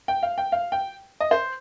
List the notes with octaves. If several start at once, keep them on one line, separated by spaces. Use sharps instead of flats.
G5
F5
G5
F5
G5
D#5
C5